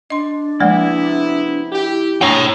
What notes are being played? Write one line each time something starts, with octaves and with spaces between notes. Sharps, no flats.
D4 D#5 C6
C3 F3 G#3 A#3 B3 E4
E4 G4
D4 G#4 C#5 G5 G#5 A#5